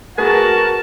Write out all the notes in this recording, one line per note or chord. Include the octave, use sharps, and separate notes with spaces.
A3 F#4 G#4 A#4 B4 A5